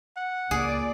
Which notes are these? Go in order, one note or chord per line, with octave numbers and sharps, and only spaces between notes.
F#5
C#2 A#2 G#4 D5